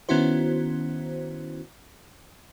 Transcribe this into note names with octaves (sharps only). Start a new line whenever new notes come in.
D#3 B3 C#4 E4 F#4 C5